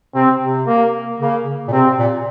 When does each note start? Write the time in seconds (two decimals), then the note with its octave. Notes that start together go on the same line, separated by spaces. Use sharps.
0.14 C3 C4
0.41 C3
0.67 A#3
1.20 C#3 A#3
1.68 A#2
1.72 C3 C4
1.98 A#2